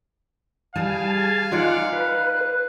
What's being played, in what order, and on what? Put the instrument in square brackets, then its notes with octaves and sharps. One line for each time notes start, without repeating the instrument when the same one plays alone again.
[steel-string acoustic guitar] G3 G#4 [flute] G4 [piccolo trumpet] F5 [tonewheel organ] G#5 A5
[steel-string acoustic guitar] D#4 D5 [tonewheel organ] F4 F#5 [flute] G#5
[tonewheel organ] B4 [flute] F#6